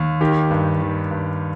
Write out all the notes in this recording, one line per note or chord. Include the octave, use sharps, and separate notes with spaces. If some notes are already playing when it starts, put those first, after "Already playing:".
Already playing: D#2
D#3 G4
G2
D#3
G2